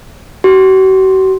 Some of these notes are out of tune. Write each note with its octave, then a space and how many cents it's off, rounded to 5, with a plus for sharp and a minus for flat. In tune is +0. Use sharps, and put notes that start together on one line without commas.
F#4 +45